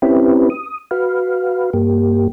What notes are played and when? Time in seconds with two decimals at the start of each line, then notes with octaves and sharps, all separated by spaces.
0.02 C4 C#4 E4 G4 B4
0.50 D#6
0.91 F#4 B4 F5
1.73 G2 A#3 G4